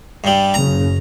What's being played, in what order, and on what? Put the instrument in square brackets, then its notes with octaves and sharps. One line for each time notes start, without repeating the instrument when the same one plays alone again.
[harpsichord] G2 G3
[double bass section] F#1 C#3 [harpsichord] A#5